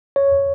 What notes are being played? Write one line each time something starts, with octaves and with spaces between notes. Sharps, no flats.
C#5